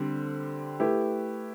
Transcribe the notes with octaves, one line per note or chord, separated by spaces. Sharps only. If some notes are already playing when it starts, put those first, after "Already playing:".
Already playing: D3 G3 C4
A3 E4 G4 B4